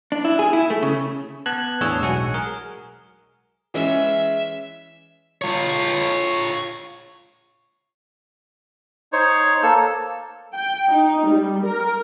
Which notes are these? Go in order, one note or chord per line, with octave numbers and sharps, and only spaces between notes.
D4
E4
G#4
E4
A3
C#3
B3 A5 F#6 G#6
E2 A2 D4 G#4 C#5 E6
B1 G#3 F#4 F#5 G#5
G#4 A#4
E3 G#3 C#4 E5
F4 C#5
D#4 C5 C#5
A#3 A4 E6
G5
D#4
G3
A#4